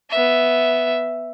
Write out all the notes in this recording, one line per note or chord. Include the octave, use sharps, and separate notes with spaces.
B3 E5